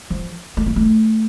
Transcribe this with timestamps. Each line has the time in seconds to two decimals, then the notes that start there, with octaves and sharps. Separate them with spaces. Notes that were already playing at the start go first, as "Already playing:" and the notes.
0.10 F3
0.57 A3
0.66 A#3
0.76 A3